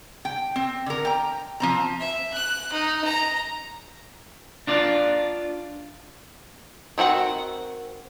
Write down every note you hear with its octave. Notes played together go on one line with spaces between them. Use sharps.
G5
C4
D3 A#4
G5 A#5
F3 C4 A#5
E5
F#6
D#4
A#5
D4 F4 D5
D#3 C4 F#4 F#5